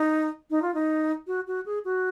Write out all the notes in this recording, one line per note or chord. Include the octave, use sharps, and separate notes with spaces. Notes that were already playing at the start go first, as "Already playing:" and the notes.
Already playing: D#4
D#4
F4
D#4
F#4
F#4
G#4
F#4